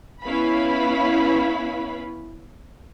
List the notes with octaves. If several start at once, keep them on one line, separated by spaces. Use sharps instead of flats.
B3 C#4 E4 B4 F5 B5